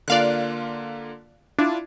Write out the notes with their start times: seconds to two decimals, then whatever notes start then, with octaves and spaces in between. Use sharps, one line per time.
0.08 D3 A#3 F4 D5 F5 F#6
1.59 D4 E4 F4